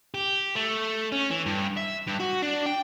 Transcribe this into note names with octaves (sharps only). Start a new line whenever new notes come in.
G4
A3
C#4
E3
G2
E5
G2
F#4
D4
G5